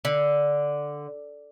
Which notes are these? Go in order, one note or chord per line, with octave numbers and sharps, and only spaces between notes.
D3